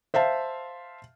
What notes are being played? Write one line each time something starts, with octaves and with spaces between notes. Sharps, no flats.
C5 E5 F5 A5